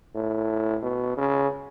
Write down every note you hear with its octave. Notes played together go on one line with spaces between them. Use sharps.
A2
B2
C#3